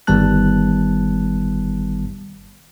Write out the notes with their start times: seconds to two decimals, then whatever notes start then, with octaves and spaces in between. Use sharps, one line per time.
0.07 G1 D#3 G3 B3 A5 F#6